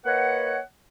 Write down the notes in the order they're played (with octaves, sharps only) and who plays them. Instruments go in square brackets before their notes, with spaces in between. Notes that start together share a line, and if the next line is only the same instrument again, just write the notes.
[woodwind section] A#3 B4 C#5 D#5 F#5